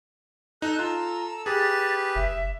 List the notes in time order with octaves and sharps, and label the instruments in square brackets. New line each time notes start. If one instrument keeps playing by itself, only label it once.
[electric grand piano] D#4 [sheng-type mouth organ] A4 E6 [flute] F#6
[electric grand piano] F4 [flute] A#5
[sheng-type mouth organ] G4 B4 [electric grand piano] G#4 [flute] A6
[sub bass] F1 [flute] E5